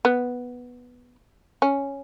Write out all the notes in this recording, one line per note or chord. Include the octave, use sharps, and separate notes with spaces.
B3
C#4